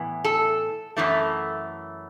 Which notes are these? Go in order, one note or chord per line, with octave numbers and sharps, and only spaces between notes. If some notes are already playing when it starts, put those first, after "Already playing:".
Already playing: A2 E3 B3
A4
F#2 E3 A3